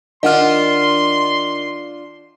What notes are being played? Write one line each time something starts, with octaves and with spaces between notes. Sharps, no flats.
D#3 D4 F4 D#5 F#5 C6 F6